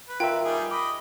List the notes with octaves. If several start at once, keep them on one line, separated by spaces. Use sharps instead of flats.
B4
F4 A#4 E5 G5
G3 D#4 G#4
D#5 B5 D6